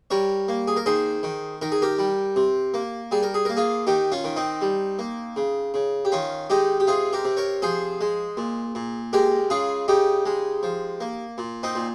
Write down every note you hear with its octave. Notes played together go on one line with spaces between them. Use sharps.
G3 A#4 C#5
A#3
G#4
A#4
D#3 G#4 C5
D#3
D#3 A#4
G#4
G4 A#4
G3
C3
A#3
G3 G#4
A#4
G#4
A#3 A#4
F4 G#4
D#3 D#4 G4
C#4 F4
D#3
C4 D#4
G3
A#3
C#3
C#3
G4
D#3 C#4 F4
G#3 D#4 G4
G4
C3 F4 G#4
G4 A#4
C3
A#4 C#5
F3 G#4 C5
G#3
A#2
A#2
G#3 G4 A#4
C#3 F4 G#4
C#3 D#4 G4
G#3
F3
A#3
A#2
C4 D#4
A#2